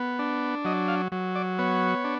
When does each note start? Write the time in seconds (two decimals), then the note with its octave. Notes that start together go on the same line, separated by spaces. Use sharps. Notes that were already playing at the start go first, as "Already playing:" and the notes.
Already playing: B3
0.19 D4
0.65 F#3 D#5
0.88 F5
1.12 F#3
1.35 D5
1.59 B3 C#5
2.04 D4